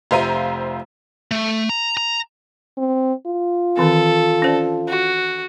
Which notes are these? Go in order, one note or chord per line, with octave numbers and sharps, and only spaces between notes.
F1 F4 C5 E5 A#5 D#7
A3
A#5
A#5
C4
F4
D#3 E3 C4 A4
C#4 C5 D5
F#4